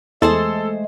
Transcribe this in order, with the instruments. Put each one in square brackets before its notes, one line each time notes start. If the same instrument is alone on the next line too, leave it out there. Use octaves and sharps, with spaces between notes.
[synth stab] E2 [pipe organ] G#3 A3 [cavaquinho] G#4 C5 A5 [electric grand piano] A4